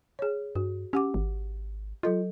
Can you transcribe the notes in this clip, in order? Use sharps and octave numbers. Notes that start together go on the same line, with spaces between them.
G#4 C#5
G2 F#4
C#4 G4 F#5 D6
G#1
F#3 F4 A4 D#5